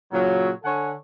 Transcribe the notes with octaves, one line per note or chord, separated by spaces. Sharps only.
A#2 C#3 F#3
D3 A4 C#5 F#5 G#5